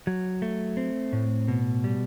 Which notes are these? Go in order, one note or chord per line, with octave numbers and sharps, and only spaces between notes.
F#3
A3
C4
A2
B2
G3